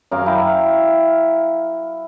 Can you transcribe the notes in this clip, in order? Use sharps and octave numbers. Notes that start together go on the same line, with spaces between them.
F#2 A#4 F5
E4 E5 F5 G5